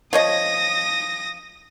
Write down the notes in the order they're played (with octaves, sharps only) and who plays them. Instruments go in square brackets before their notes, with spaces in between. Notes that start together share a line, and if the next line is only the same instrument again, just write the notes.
[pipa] F3 C#5 D#5 [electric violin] D#6 A#6